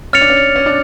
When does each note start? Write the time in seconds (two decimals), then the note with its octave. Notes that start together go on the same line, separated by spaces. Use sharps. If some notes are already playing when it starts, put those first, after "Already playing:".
0.13 C#4 F6 A6 C#7 F7
0.21 D4
0.30 C#4
0.56 C#4
0.66 D4